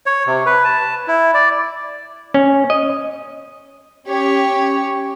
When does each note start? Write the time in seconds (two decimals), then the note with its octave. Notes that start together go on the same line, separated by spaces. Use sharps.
0.06 C#5
0.27 C3
0.46 B4
0.64 A5
1.08 E4
1.34 D5
2.34 C#4
2.70 D#5
4.06 C#4 G4 C#5